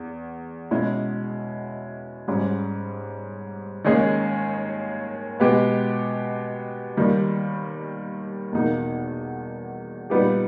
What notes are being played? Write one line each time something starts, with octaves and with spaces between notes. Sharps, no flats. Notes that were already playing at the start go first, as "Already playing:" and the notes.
Already playing: E2
B2 G#3 C#4 E4
G#2 G3 C#4
D#2 D#3 G#3 C#4 G#4
B2 G#3 B3 G4
D#2 D#3 G3
E2 B2 A#3 D#4
A#2 G3 B3 D#4 G4